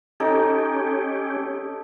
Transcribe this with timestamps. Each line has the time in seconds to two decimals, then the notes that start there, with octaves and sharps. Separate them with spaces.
0.20 C#4 D#4 G4 A4